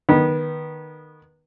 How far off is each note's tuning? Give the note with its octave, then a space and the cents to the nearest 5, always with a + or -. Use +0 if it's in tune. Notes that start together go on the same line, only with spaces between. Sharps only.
D#3 -20 B3 -25